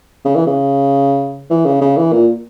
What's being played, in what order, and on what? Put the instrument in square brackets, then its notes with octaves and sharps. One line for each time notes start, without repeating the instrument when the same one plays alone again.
[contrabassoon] C#3
E3
C#3
E3
C#3
C#3
E3
A#2